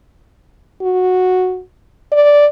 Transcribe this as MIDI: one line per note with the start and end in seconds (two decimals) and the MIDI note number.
0.81 1.60 66
2.12 2.47 74